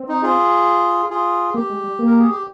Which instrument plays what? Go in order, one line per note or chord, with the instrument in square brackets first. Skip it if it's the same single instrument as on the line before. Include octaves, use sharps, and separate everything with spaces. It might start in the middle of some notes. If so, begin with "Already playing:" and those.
Already playing: [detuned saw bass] C4
[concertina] D#4
F4 G#4
F4 G#4
[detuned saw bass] A#3 [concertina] G4
[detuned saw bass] G#3
G3
A#3
[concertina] A#4
G#4
G4